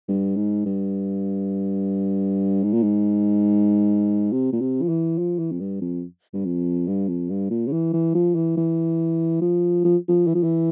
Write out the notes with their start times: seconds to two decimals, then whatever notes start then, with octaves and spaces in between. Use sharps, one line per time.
0.09 G2
0.37 G#2
0.66 G2
2.63 G#2
2.73 A#2
2.83 G#2
4.33 C3
4.53 A#2
4.61 C3
4.82 F3
4.89 E3
5.18 F3
5.39 E3
5.52 F2
5.60 G2
5.81 F2
6.34 G2
6.45 F2
6.88 G2
7.08 F2
7.30 G2
7.51 A#2
7.67 C#3
7.72 E3
7.93 E3
8.15 F3
8.35 E3
8.57 E3
9.42 F3
9.85 F3
10.09 F3
10.27 E3
10.35 F3
10.43 E3